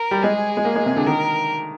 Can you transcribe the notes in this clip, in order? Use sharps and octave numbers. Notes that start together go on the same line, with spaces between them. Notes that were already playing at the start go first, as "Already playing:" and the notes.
Already playing: A#4
G3
G#3 G#4
G#3
A#3
G#3
C3
D3
D#3 A#4